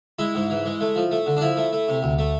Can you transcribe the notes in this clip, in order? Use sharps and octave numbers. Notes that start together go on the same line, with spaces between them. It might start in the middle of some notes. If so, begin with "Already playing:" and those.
G#3 E4
G#2
E3
G#3
A3
F3
A3
D3
D4
F3 E4
A3
A3
C3
D2
A3